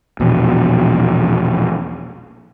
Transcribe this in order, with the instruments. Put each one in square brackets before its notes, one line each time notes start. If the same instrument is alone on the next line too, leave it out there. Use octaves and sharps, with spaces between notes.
[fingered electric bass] A#1 E2 B2